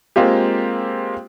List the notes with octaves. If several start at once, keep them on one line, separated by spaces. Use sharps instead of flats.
G#3 A#3 C4 F4 G4